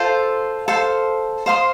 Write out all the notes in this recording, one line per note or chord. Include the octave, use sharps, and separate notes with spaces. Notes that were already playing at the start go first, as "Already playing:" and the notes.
Already playing: F4 A4 C5
A4 C5 F5 C6
C5 F5 C6 D#6